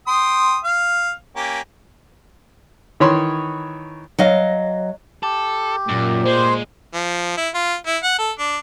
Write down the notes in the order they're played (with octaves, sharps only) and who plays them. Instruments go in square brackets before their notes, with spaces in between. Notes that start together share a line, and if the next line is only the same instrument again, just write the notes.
[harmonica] G5 C6 D#6
F5
A#3 C#4 G4
[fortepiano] D#3 E3 C#5 B5 C6
[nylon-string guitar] F#3 D#5 F5
[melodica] G4 [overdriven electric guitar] A4
[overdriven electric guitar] F#2 [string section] A#2
[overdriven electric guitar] G#3 [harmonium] C5
[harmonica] F3
E4
F4
E4
F#5
A4
D4